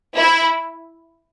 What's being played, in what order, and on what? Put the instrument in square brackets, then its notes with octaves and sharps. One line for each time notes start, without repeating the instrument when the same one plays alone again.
[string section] E4